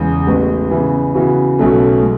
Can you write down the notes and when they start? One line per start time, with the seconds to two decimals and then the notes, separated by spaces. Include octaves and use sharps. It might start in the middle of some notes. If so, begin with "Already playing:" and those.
Already playing: E2 C#3 G#3
0.27 A1 A2 G#3 B3
0.71 C#3 E3 B3
1.15 C#3 E3 B3 F#4
1.58 B1 B2 F#3 A3 C#4
2.02 G#3